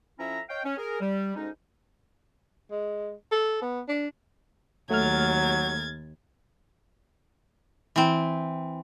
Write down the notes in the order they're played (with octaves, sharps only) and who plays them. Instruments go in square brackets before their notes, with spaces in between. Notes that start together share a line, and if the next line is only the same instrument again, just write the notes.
[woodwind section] F2 F3 C#4 E4 E5 A#5
C#5 D#5 F5 G5
C#4
G#4 A#4
G3
D2 G#2 G#3 C#4 D#4
[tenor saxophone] G#3
A4
B3
D4
[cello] D#2 [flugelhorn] F#3 [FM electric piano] A3 F6 [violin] G#6 A6
[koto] E3 C4